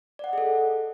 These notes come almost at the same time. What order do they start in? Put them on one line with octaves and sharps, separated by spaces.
D5 F#5 D#5 G#4 A4